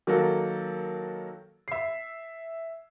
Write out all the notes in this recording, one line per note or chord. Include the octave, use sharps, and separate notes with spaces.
D#3 F#3 A#3 F#4 A4
E5 C7